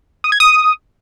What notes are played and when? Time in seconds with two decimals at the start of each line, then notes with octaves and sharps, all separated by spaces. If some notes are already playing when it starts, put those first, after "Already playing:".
0.24 D#6
0.32 G#6
0.40 D#6